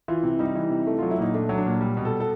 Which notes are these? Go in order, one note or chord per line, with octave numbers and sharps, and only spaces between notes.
E3 F4
C3
G3 D#4
E3
C3
A3
F#3 F4
E4
A#2 D#4
A3 D4
F#3
D4
A#2
G3
B2
A4
A4